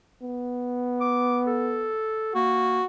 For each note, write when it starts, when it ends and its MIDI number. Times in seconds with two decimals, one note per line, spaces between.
0.23 1.96 59
1.01 1.40 86
1.47 2.34 69
2.34 2.80 58
2.34 2.85 66